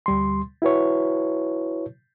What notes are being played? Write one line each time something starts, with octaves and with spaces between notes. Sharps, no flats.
D2 G3 C6
E4 F#4 B4 C#5